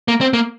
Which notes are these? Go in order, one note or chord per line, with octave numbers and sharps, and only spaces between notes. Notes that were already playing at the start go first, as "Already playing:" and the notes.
A#3
C4
A#3